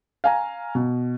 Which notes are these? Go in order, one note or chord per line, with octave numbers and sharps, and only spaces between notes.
F5 G#5 A#5
B2